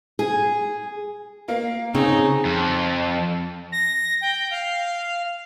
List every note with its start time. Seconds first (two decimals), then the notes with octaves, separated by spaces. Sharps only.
0.19 G#4
1.48 A#3 F5
1.95 C#3 C4 D#4 G#4
2.45 F2
3.72 A#6
4.21 G5
4.51 F5